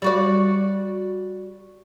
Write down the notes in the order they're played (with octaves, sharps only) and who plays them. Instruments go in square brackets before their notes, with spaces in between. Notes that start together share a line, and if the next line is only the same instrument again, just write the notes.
[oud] G3 F#4 D5